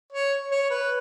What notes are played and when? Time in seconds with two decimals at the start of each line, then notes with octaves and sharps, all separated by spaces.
0.13 C#5
0.51 C#5
0.70 B4